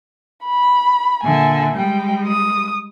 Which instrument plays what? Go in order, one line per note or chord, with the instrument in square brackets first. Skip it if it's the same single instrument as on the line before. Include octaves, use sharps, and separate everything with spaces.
[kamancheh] B5
[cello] A#2 D3 [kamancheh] E5 G#5
[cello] G3 G#3 [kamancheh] G5
[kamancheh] D#6